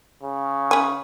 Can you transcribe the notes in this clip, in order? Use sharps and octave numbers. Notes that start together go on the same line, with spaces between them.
C#3
C#4 G#5